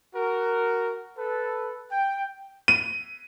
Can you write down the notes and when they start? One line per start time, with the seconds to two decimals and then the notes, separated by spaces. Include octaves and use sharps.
0.15 F#4 A#4
1.17 A4 B4
1.91 G5
2.68 D#7